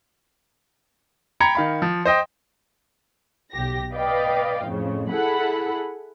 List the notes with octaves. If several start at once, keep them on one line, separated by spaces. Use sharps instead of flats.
G5 A#5 B5 G#6 C#7
D#3 F5 B5
F3
C5 D#5 G5
B1 G4 A#6
B4 D5 D#5 F5 G5
F2 A2 C#3
E4 G#4 A4 F#5 B5